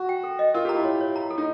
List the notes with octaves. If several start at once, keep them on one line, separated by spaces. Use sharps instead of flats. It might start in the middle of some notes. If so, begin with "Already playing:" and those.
Already playing: F#4
G5
A4
D#5
F4 A#4
G4 A#5
E4
C#5
C#5
A#5
A4
D#4